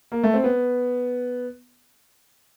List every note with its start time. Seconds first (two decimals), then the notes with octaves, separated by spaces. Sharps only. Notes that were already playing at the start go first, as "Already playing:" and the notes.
0.12 A#3
0.23 A3
0.34 C4
0.44 B3